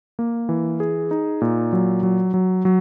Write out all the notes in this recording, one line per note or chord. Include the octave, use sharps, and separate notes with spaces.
A#3
E3
G#4
D#4
A#2
F#3
F#3
F#3
F#3